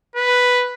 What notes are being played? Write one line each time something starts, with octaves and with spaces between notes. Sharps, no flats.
B4